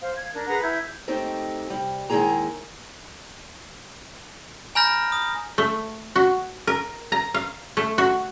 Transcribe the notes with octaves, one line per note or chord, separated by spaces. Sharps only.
C5 F5
G#6
D4 A#4
G#4 B4 F#5 A#5
E4 G6 G#6
A3 C4 D#4 G4
C3 G3
D#2 D#3 G#3 E4 G#4 A#5
G#5 A#5 B5 F6 G6 A#6
D#6
A3
F#4
A#4
A#5
F5
A3
F#4